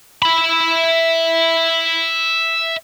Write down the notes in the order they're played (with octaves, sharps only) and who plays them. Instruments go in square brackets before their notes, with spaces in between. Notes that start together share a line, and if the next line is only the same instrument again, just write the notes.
[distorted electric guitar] E5 B5